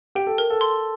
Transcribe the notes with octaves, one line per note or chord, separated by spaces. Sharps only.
G4 G5
A4
A#4
A4
C6